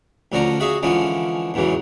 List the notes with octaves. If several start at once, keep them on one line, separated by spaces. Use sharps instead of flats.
D2 D3 F3 C#4 A#5
F#4 G#4 E5 F5
D3 E3 F3 G#3 C#4
E2 G#2 C#3 E3 F#3